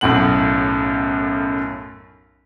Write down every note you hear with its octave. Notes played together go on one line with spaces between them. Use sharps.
B1 F#2 A2 F#5 F#7